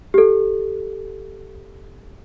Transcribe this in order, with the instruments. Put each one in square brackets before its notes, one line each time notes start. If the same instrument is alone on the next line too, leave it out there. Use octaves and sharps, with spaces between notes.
[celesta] G4 A4